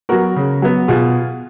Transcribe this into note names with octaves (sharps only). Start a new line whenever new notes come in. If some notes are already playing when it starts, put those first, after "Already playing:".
F#3 B3 F#4 A#4
C#3
F#3 B3
B2 F4 G#4